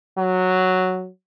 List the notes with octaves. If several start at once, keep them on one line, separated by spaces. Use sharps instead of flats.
F#3